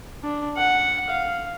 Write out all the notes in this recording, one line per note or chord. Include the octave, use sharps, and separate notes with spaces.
D4
F#5
F5